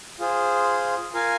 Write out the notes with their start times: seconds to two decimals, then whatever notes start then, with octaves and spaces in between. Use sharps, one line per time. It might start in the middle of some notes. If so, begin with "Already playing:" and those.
0.19 F4 G#4 C5
1.14 F4 A#4 F5 G#5